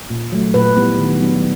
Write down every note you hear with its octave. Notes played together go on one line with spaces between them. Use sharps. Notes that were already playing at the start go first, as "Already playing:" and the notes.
A#2
F#3 A3
A#2 B4
G3 B3 E4
D#3
F#3 B3 D4